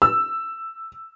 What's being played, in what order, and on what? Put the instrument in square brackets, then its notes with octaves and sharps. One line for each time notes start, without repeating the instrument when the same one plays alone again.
[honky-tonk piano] E6